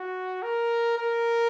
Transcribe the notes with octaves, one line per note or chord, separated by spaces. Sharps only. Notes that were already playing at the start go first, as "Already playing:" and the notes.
Already playing: F#4
A#4
A#4